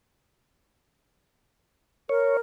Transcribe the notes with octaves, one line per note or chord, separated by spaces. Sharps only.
A#4 C#5